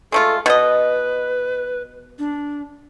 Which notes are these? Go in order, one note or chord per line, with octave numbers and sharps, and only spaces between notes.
G#3 A3 F4 A4
B2 B4 D#5
D4